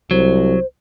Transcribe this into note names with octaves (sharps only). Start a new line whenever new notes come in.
C2 F#3 C5